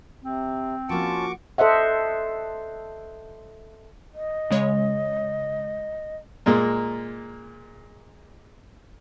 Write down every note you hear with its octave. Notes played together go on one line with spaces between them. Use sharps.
C3 C4
F3 A#3 C#4 F4 F#4 A5 C#6 D6
A4 C5 D#5 E5 F#5
D#5
C#3 G#3 C#5
A#2 G#3 A#3